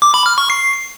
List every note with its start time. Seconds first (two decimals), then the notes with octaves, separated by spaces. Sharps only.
0.02 D6
0.14 B5
0.26 F6
0.38 C#6
0.50 C7